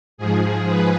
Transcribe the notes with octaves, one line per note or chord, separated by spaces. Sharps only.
G#2 F3 G#4
B4